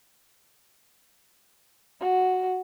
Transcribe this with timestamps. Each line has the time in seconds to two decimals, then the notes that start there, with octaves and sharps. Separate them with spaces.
2.00 F#4